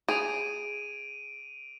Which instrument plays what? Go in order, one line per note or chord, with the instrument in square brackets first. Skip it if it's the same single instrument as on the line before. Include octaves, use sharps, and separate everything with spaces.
[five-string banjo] G#4 [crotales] D7 D#7 F7